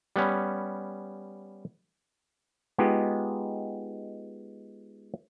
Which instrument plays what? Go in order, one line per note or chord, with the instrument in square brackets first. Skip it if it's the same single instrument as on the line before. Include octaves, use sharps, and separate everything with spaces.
[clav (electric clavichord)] G3 B3 C#4
G#3 B3 D#4 F4 G4